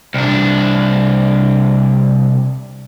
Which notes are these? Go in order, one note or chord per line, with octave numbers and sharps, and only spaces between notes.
C2 D4